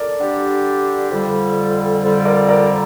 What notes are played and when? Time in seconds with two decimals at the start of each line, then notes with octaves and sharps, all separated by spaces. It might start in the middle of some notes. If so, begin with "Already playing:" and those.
Already playing: A4 A#4 D5
0.19 D3 G3 D4 G4
1.10 F2 D3 G3
2.03 F2 D3 G3
2.25 A#4 D5
2.49 A#4 D5